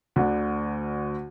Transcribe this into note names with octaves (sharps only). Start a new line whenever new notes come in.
D2 D3